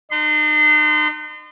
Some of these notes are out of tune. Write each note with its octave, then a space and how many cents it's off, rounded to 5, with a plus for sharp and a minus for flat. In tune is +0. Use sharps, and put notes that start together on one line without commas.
D#4 -40 C6 -30